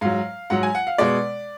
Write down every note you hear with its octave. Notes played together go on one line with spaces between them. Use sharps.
G#2 F#3 F5
G#2 F#3 F#5
G#5
F#5
F5
B2 G#3 D5